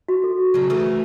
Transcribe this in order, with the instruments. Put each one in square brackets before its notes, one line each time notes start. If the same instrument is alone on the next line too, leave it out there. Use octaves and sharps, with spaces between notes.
[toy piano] F#4
A4
[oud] C#3 F#3
E3 A3